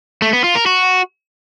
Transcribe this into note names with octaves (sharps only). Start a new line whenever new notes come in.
A3
B3
F4
A#4
F#4